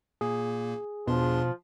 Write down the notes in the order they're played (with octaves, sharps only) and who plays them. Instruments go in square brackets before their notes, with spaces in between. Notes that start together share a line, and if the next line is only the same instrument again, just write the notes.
[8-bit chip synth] A#2 A#3 [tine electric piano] G#4
[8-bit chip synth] E2 D4 C6 [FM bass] B2 [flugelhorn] F3